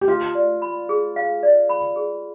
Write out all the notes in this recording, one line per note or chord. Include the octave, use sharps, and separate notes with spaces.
G4
F4 F5
D5
B5
G#4
F5
D5
B5
G#4